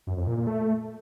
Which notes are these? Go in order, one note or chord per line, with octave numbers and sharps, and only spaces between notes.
F#2
F2
A#2
A#2
A3